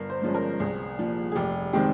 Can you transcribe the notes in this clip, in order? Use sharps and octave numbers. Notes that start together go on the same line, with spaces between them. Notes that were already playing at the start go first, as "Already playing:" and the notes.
Already playing: G1 A#4
C5
G2 F3 G#3 C#4
A#4
C2 G#4
A#2 F3
G#4
F1 G4
D#3 G#3 C4 G4